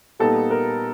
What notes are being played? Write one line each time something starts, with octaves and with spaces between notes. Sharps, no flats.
A#2 G3 B3 D#4 A4
A#4